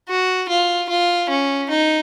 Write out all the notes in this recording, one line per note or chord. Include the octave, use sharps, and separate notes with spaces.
F#4
F4
F4
C#4
D#4